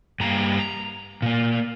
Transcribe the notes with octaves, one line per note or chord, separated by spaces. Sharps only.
G2 G3 A#3 A#5
A#2 A#3